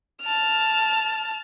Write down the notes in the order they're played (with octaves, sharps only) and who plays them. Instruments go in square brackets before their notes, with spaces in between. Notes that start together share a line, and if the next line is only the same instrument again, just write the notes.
[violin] A5 F6